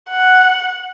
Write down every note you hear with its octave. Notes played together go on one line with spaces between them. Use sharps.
F#5